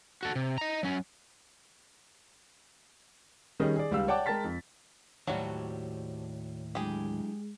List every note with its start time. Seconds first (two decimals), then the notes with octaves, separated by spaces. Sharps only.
0.23 F#4 A4
0.35 C3
0.58 D#5 A#5
0.83 F#3 C#4
3.60 D#3 G3 C#4 G#4 D#5
3.76 G#4 D5
3.91 C#2 G3 F5 E6
4.08 C#5 D5 F#5 G5 A5 D6
4.26 G#3 A#4 G5 A5 A6 B6
4.44 F2
5.27 D#2 A2 F#3 G3 F#4 G4 C5 A5
6.75 F#3 G#3 D4 E4 G4 G#4